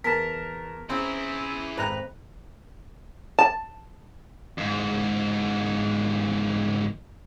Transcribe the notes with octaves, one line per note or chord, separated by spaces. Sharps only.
E2 A#4 A5 B6
C4 C#4 E4 G#4 A#5
G#1 F2 B4 A#5 F#6
A5
F2 G#2